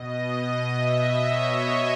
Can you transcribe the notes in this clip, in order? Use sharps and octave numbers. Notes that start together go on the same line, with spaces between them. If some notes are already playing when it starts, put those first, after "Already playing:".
Already playing: B2 D#5
D#5
E5
C#5